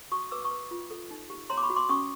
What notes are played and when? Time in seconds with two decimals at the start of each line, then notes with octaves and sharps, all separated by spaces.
0.12 F#4 C#6 D#6
0.31 B4 D6 E6
0.44 C#6 D#6
0.51 B4
0.71 F4
0.91 A4
1.11 D#4
1.30 G4
1.50 C#5 A#5 C6
1.57 D6
1.63 B5 C#6
1.70 F#4
1.76 C6 D6
1.89 C#4 C#6 D#6